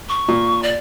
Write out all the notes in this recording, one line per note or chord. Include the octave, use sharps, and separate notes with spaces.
C#6
A#2
D5